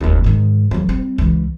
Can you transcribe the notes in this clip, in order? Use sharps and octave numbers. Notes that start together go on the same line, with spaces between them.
F1 D#2
G#2 D#3
F2 F#3
G3 C4
C#2 E3